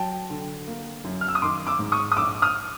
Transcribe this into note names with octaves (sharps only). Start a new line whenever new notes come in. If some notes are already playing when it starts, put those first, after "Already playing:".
Already playing: F#3 G5 A5
D3
A#3
F#2
F6
E6
D#6
D#3 C6 D6
D6 E6
G#2
C#6 D#6
D#6
A#1 D6 E6
D#6 F6